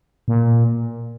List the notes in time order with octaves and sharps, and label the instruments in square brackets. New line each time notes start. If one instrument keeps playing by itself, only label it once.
[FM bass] A#2